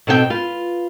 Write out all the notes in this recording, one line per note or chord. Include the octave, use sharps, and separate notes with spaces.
B2 C4 D#4 A4 A#4 G5
F4 B4